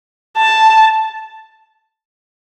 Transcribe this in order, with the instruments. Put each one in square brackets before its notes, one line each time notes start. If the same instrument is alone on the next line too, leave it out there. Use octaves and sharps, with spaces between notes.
[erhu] A5